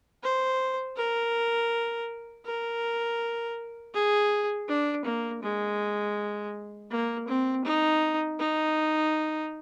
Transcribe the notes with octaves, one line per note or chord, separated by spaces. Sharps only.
C5
A#4
A#4
G#4
D4
A#3
G#3
A#3
C4
D#4
D#4